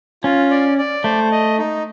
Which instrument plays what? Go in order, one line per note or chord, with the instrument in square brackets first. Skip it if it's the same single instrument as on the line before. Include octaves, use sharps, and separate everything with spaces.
[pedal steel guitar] C#4 [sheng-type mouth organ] F4
[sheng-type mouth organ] D5
D5
[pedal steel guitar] A3 [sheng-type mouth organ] C5
[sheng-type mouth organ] D#5
D#4